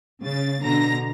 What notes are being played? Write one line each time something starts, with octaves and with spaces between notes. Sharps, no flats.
C#3 A6
B2 D3 A#5 A#6